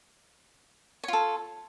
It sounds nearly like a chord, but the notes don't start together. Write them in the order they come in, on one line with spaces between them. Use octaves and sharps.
C#5 F4 A4